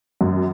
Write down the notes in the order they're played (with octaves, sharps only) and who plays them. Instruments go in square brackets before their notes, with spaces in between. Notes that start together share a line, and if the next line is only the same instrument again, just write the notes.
[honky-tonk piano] F#2